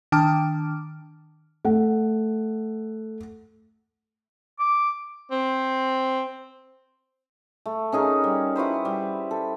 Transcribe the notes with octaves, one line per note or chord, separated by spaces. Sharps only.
D#3 D4 G5 A5 D6 F6
A3 F#5
D6
C4
A3
C#4 D#4 G#4 A#4
G3
E4 F#4 B4 C5
G3
A4